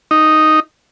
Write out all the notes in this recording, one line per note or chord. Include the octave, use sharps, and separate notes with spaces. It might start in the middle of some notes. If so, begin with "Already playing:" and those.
D#4